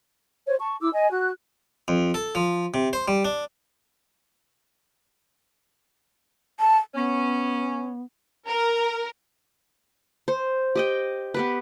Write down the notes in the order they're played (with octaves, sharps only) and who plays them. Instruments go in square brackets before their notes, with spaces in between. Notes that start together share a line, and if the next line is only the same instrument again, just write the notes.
[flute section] C5 C#5
A5 C#6
E4 D6 E6
D#5 G#5
F#4 F#6
[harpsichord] F2
A4
F3
C3
C5
G3
D4
[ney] A5
[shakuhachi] B3 [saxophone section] C#4
[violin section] A#4
[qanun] C5
G4 D#5 G5
B3 G4 B4